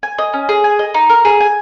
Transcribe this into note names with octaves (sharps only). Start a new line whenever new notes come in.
G#5
D#5
C#4
G#4
G#5
D#5
D#4
A#4
G#4
G#5